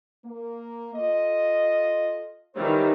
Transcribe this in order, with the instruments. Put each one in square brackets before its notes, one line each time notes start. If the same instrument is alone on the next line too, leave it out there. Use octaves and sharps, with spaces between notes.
[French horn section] A#3
F4 A4 D#5
[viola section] D#3 E3 G3 [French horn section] C5 C#5